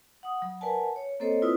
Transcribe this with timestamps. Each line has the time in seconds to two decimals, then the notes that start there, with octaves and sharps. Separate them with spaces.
0.23 F#5 D#6
0.42 F#3
0.61 A#4 B4 D5 F#5 G#5 A5
0.96 C#5
1.20 A#3 C4 A4 C5 C#5 D#5
1.42 C4 E4 F4 B4 D5 D#6